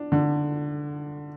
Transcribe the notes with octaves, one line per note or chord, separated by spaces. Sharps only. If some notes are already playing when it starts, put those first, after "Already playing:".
Already playing: D4
D3